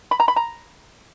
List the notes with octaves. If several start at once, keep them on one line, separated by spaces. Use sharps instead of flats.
B5
A#5
B5
A#5